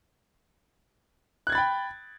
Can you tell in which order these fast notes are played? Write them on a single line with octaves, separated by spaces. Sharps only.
F#6 G#6 A6 B5 G5